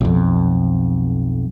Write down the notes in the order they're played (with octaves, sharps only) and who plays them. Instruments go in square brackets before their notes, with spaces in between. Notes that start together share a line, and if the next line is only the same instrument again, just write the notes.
[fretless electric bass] B1 F2